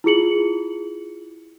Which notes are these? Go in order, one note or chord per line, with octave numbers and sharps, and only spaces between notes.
E4 F4 G#4 C#7 F#7